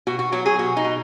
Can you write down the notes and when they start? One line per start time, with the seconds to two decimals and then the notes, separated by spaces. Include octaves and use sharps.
0.07 B2 F#4
0.19 F#4
0.32 F#3 F#4
0.46 G#4
0.58 B2 F#4
0.77 D#4
0.84 B2